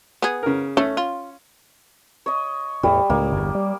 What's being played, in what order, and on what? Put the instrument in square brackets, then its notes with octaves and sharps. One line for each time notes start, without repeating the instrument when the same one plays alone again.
[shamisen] B3 G#4
[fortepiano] C#3 A#4
[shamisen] A3 [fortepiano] C#4
[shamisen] F4
[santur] C#5 D#5
[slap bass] E2 A2 [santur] G3
[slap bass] C#2 A2 [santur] A#3
[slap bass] G1 E2
G3